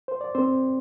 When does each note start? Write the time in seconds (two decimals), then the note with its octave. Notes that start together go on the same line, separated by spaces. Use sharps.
0.08 C5
0.21 D5
0.35 C4 C5